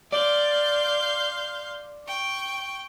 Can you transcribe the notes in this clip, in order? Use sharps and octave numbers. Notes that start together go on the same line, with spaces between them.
D5 F5 C6 G6
G5 C#6